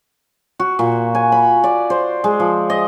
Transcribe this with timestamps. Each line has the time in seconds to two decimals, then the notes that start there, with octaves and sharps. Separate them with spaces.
0.59 F#4
0.79 A#2
1.15 G#5
1.32 B5
1.64 D5
1.90 C5
2.24 G#3
2.40 F3
2.70 D#5